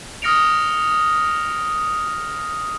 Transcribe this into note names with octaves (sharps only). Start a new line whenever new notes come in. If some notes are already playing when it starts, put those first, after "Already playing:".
D#6 F6 A#6 C#7 D7 F7